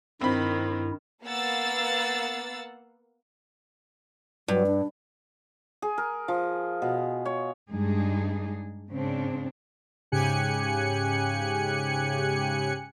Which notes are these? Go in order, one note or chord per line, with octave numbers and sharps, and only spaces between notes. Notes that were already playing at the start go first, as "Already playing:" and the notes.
G2 D#3 C4 E4 B5
A#3 B3 F5 F#5 E6 A6
G2 F#3
D4
G#4
A#4
F3
B2
C#5
G2 G#3 D4 D#4 G#4
G#2 C#3 C4 D4
G#2 C#3 G4 G#5 F#6 C#7